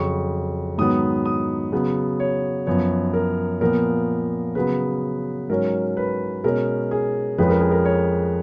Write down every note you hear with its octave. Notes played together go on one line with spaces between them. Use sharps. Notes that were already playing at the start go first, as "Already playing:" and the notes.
Already playing: F2 C#3 F#3 C#6
G#2 D#3 F#3 B3 D#6
D#6
C#3 F#3 B3
C#5
F#2 F3 B3 C#5
A#4
A#2 F3 B3 A#4
C#3 F#3 B3 B4
G#2 F#3 C#4 A#4
B4
B2 G#3 C#4 A#4
G#4
F2 F3 G#3 C#4 B4
A#4
G#4
A#4
C#5